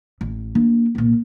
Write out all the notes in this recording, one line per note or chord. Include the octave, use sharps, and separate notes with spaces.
A1
A#3 D4
C2 A#2